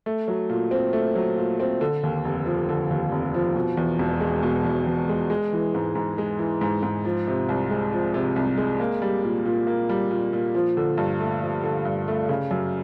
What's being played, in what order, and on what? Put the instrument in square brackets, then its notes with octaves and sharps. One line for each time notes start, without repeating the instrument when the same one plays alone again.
[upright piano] A3
F#3
A#2
C4
A3
F#3
A#2
C4
D3
D#2
F1
F3
D3
D#2
F1
F3
B2
E2
E1
G#3
B2
E2
E1
G#3
G#3
E3
G#2
G#2
G#3
E3
G#2
G#2
F3
C3
C2
G#3
F3
C3
C2
G#3
A#3
G3
A#2
A#2
A#3
G3
A#2
A#2
F3
D3
G2
A3
F3
D3
G2
A3
C#3
F#2